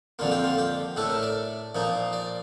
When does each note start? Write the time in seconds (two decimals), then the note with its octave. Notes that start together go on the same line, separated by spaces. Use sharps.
0.19 F2 D3 G3 A#3 F4
0.32 G4
0.44 F4
0.58 G4
0.96 A2 A3 D4 A4
1.10 A#4
1.23 D5
1.75 A#2 F3 A#3 D#4
2.13 D5